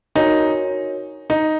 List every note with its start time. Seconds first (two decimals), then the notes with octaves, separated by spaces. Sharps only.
0.16 D#4 F#4 A#4 C#5 G#5
1.30 D#4